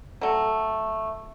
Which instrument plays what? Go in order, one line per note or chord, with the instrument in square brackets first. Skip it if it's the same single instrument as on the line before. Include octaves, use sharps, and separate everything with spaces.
[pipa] F#3 A3